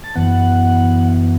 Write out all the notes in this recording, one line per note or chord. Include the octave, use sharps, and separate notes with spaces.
A5
F#2 E3 B3 F#5